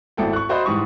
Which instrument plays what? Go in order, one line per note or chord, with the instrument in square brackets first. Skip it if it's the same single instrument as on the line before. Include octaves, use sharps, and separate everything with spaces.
[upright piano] G#1 E4 A4 G5
C#6 F#6
F#4 C5 D5 D#5 B5 C6
G#2 E3 G3 C#6 D#6